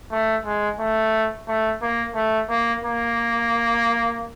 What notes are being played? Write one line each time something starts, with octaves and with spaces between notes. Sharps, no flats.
A3
G#3
A3
A3
A#3
A3
A#3
A#3